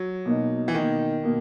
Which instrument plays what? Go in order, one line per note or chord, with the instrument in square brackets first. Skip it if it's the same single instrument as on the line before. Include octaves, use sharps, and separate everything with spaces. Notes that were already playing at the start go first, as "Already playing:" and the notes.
Already playing: [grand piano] F#3
[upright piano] B2 A#3 D#4
[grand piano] E3
[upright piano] B2 A#3 D#4 [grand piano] D#3
[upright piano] B2 A#3